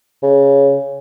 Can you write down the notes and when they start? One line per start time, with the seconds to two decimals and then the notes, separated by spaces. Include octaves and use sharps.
0.23 C#3